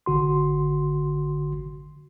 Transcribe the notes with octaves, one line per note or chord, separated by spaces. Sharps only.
G#1 D3 F#4 C6